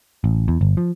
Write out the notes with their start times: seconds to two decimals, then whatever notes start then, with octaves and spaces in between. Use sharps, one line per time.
0.24 A1
0.48 E2
0.61 G1
0.77 F3